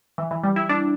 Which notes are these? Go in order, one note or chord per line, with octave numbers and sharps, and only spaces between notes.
E3
E3
G3
E4
D4